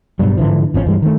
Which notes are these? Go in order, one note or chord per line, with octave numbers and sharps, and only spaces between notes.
G2 B2 F#3 G3
G#2 D3 E3 F3
G#1 F3 C#4
G2 E3 G3 G#3
D#3 A3